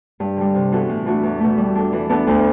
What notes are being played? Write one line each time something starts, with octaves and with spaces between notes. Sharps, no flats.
G2
D3 G3
C3
E3 B3 F#4 A4
A2
E3 A3 D4 F#4
E2
B2 A3
G3
D4 A4
E3
B3 D4 A4
D2